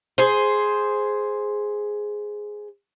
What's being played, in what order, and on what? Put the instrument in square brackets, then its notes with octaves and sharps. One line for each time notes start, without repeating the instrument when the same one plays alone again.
[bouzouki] G#4 C5